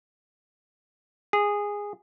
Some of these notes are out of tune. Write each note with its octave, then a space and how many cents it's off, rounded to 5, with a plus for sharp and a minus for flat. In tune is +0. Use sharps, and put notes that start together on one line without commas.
G#4 -15